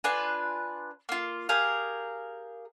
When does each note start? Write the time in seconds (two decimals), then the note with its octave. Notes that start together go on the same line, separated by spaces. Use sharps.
0.04 D4 F4 B4 G#5
1.09 A#3 F4
1.49 G4 G#4 A#4 F5